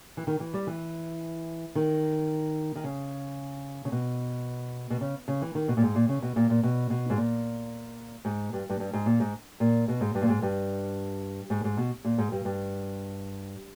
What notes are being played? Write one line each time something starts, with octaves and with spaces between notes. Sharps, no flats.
E3
D#3
E3
G3
E3
D#3
D#3
C#3
C#3
B2
B2
C#3
C#3
E3
D#3
B2
A#2
G#2
A#2
C#3
B2
A#2
A#2
B2
B2
G#2
A#2
G#2
G2
G2
G2
G#2
A#2
G#2
A#2
B2
G#2
G2
A#2
G#2
G2
G#2
G#2
B2
A#2
G#2
G2
G2